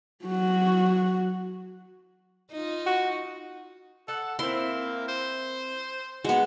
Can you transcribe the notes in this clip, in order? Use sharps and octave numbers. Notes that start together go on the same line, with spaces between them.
F#3 F#4
D#4 F4
F#4
A4 F#5
A#3 C4 E4 C6
C5
G#3 B3 F#4